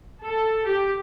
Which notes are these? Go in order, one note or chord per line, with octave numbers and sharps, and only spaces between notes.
A4
G4